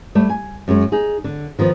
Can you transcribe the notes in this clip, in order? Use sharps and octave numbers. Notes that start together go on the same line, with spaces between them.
G3 A3
G#5
F#2 G#3 C#5
D#4 G#4
D3
D#3 F3 B3